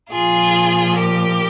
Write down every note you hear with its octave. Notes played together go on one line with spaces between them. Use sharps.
A#2 F3 F4 G#4
G4 A#4